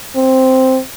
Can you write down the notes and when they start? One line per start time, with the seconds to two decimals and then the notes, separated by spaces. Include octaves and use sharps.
0.16 C4